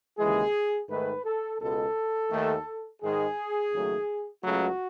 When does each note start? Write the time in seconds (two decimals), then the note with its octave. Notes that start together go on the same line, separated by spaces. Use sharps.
0.19 D#2 C#3 E3 G#3 G#4
0.89 G#2 D#3 A3 B4
1.24 A4
1.60 C#2 B2 G#3 A4
2.31 D#2 D#3 A3
3.02 G#2 D#3 G#3 G#4
3.72 D#2 C#3 F#3 A3
4.43 C#2 C#3 F#3 A3 F#4